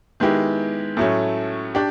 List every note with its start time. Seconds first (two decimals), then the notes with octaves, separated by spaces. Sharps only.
0.20 D#3 G#3 B3 E4 G4
0.97 A2 F#3 A3 C#4
1.75 D4 G4